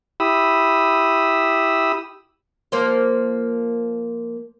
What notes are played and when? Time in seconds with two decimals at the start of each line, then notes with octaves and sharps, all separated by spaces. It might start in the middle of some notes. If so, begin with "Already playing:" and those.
0.20 E4 G4 B5 D#6 E6
2.72 F3 A#3 C5